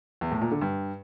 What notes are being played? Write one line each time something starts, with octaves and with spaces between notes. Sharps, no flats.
E2
A2
A#2
D3
G2